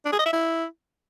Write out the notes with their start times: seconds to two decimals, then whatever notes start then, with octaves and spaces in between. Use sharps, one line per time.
0.05 D4
0.12 G#4
0.19 D#5
0.26 E5
0.33 E4